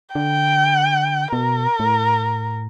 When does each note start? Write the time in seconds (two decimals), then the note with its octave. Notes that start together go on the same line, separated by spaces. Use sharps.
0.15 D3 G5
1.33 B2 A#4
1.80 A2